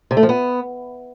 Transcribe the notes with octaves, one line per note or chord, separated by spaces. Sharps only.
C3
A3
F3
B3